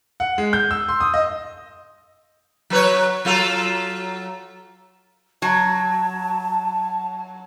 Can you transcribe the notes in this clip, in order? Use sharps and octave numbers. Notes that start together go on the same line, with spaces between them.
F#5
G#3
G6
E6
C6
D#6
D#5
F#3 B4 C#5
F#3 F4 A4
F#3 A5